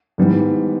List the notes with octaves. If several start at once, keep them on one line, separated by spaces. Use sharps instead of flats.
G#2 D#3 G3 B3 E4